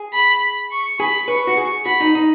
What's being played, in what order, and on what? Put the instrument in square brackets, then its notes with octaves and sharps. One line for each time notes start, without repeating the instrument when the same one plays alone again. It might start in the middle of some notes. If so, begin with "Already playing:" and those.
Already playing: [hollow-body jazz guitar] G#4
[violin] B5
C#6
[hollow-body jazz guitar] G#4 [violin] B5
[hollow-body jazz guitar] B4 [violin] C#6
[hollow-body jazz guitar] F#4
G#4
[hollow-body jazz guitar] F#4 [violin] B5
[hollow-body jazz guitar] D#4
D#4